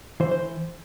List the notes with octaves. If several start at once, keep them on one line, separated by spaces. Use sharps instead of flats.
E3 C5
C5